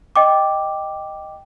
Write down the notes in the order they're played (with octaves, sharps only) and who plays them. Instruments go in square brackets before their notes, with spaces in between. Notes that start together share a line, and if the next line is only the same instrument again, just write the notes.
[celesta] D#5 G5 D6